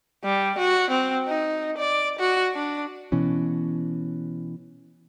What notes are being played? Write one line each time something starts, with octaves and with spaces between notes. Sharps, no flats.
G3
F#4
C4
D#4
D5
F#4
D4
B2 E3 C#4